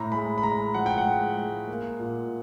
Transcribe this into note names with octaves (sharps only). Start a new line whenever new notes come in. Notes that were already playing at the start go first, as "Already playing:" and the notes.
Already playing: A2 A#5
G#3 B5
B5
G#3 A#5
F3 F#5
G5
F#5
G#3
G#3
A#3
A#2